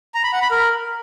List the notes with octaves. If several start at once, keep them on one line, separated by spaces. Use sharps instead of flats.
A#5
B5
F#5
B5
A#4